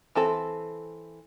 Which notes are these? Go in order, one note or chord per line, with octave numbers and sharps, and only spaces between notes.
E3 C4 A4